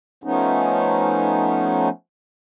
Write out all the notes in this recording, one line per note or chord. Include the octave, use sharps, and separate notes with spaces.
F3 A3 B3 C#4 D#4